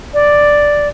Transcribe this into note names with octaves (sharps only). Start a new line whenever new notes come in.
D5